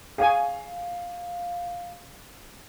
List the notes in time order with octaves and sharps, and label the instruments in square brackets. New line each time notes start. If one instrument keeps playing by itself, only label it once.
[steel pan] G#4 C#5 G#5 [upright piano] F5